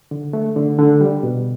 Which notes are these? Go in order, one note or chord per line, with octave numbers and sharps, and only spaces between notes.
D3
A3
D3
D3
G3
B2